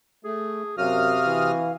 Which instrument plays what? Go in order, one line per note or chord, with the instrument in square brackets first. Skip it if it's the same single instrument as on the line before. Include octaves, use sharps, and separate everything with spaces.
[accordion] A3 [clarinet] G#4
[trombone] F#2 [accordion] C3 D#6 F6 [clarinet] F#4 [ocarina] F5
[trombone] E3